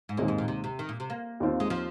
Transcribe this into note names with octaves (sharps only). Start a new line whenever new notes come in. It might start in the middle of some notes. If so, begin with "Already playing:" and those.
G#2
D#2 A#2 D#3 G#3 C4
G#2
A#2
C3
C3
D#3
A#2
C3
A#3
D#2 D#3 C4 F4
G#3
F3